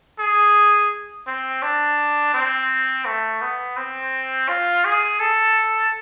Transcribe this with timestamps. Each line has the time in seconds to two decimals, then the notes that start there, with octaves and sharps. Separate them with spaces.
0.19 G#4
1.27 C4
1.62 D4
2.34 C4
3.06 A3
3.42 B3
3.77 C4
4.49 F4
4.85 G#4
5.20 A4